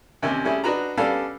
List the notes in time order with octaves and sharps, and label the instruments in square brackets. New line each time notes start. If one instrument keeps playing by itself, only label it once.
[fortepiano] D#2 C3 C#4
G3 A3 C#4 E4 G#4
D4 D#4 F#4 B4 A#5
G3 B3 C#4 D4 A4 F5